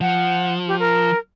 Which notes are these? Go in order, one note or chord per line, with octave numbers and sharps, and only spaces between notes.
F3 F#5
G4
A#4